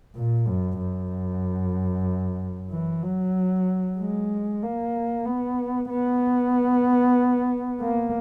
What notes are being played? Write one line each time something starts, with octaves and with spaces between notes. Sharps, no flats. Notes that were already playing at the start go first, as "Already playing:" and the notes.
A#2
F#2
F#2
E3
F#3
G#3
A#3
B3
B3
A#3